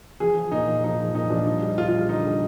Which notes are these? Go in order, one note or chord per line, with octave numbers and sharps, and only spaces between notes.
F3 G#4
F3
A#2 D#4
F3
F3 D#4
F3
A#2 D#4
F3 D4
G3 D#4
G3
G3 F4
F4
G3
F4
D3 D#4
G3